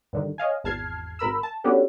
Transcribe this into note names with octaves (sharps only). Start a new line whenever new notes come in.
G2 D3 D#3
C#5 D#5 F5 G#5
G#1 E2 A5 F6 G#6 C7
G#1 A#4 B5 E6
A5
B3 C#4 D4 F#4 G4 A4